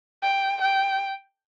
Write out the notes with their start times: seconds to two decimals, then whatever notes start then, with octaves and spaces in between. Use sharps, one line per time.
0.23 G5
0.62 G5